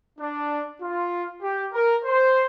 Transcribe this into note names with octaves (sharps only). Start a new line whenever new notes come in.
D4
F4
G4
A#4
C5